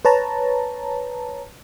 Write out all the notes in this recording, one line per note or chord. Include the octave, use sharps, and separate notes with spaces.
B4 C#5 A5 A#5